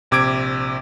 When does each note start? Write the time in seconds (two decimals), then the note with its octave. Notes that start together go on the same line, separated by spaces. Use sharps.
0.11 A#1 C3 D6 G#6 D7